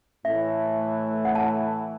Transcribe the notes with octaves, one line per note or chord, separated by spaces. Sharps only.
A2 E3 A3 E5
F#5
A5